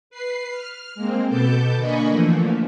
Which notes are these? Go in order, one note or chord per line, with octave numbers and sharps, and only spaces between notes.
B4 C7
F6
G#3 A#3 C4
B2 B3 A4 A5 D6 G6
D3 A#3 D#5 G#5 B5 C#6
D3 E3 F3 A3 A#3